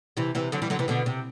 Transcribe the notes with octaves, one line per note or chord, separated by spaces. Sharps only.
C3 E3
C3 E3
D3 F#3
E3 G3
D3 F#3
C3 E3
B2 D3
C3